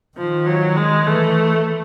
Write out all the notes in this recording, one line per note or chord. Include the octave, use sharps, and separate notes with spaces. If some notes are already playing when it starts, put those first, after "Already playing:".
D#3 F3
F#3
G#3
E3 A3